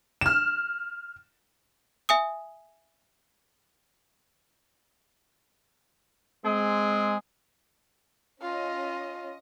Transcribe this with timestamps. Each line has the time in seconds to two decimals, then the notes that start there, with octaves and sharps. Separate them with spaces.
0.21 F6 E7
2.09 E5 G#5 D#6
6.45 G#3 C4 G#4
8.42 C#4 F4 D#5